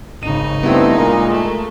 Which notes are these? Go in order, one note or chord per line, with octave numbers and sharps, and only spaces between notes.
G#1 C#3 D#4 D#7
G2 A3 B3 C4 E4
A#2 G#3 A#3 A#5
A3